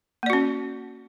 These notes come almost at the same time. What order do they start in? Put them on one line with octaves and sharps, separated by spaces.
A#3 D5 F#4 C#4